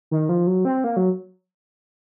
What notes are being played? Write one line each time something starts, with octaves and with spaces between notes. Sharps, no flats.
D#3
F3
F#3
C4
A#3
F#3